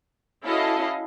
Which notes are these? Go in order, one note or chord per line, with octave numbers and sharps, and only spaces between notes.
C#4 E4 F#4 A4 D#5 F5